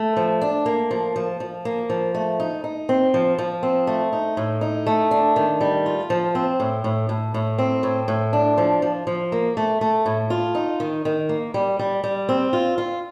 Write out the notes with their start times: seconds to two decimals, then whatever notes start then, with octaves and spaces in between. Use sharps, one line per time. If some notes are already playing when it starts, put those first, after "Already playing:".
Already playing: A3
0.17 F3
0.41 D4
0.66 A#3
0.91 F3
1.16 F3
1.40 F3
1.65 A#3
1.90 F3
2.15 A3
2.40 D#4
2.64 D#4
2.89 C4
3.14 F3
3.38 F3
3.63 C4
3.87 A3
4.13 D#4
4.37 A2
4.61 D#4
4.86 A3
5.11 D4
5.36 D#3
5.61 G3
5.86 F4
6.10 F3
6.35 C4
6.60 A2
6.84 A2
7.09 A2
7.34 A2
7.58 C4
7.83 A2
8.08 A2
8.33 D4
8.58 F3
8.82 F3
9.07 F3
9.32 A#3
9.57 A3
9.81 A3
10.06 A2
10.30 F4
10.55 D#4
10.80 D#3
11.05 D#3
11.29 A#3
11.54 G3
11.79 G3
12.04 G3
12.29 C4
12.53 F4
12.78 F4